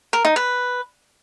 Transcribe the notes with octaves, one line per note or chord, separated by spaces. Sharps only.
A#4
D#4
B4